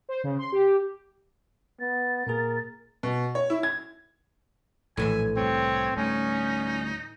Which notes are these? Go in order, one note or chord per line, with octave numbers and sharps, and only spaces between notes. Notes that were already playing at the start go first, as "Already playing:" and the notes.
C5
C#3
C6
G4
B3 A6
A#2 A#3 G#4 A#4
B2
C#5
E4
G#6
A#1 A2 E3 E5 G#5
C2 G2 C4 C#5
D2 G3 A3 C#4 D#4